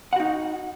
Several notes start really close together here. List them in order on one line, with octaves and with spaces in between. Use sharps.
F#5 F#4 D#4